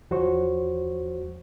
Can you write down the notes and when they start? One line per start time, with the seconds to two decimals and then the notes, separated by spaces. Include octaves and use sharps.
0.11 E2 F3 F#4 C5 C#5 C#6